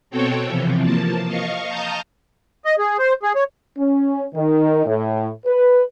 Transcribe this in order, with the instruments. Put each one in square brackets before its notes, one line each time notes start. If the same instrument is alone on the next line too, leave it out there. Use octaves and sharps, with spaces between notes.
[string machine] B2 C4 F#4 A4 C#5 G5
C3 E3 F3
F3 A#3 A5
D#5 F5 C#6
A5 A#5 D#6 F6 G6
[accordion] D#5
G#4
C5
G#4
C#5
[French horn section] C#4
D#3
A2
B4